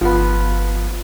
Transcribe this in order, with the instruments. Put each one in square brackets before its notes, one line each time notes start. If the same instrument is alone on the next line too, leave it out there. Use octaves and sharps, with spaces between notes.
[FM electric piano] G1 F5 [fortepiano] F3 B3